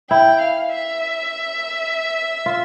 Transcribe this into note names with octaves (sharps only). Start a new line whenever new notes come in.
E4 G5
F5
E5
F4